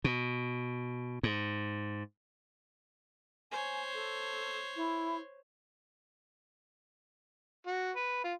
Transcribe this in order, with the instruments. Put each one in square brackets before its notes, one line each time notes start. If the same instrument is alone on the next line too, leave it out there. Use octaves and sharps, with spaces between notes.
[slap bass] B2
G#2
[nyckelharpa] C5 C#5 [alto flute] G#5
[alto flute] A4
E4
[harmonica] F#4
B4
F4